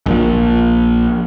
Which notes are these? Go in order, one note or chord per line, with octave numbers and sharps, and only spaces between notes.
A#1 A#2 F3